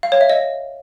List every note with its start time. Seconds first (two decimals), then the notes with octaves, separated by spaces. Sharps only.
0.03 F5
0.12 C#5
0.21 E5
0.30 D#5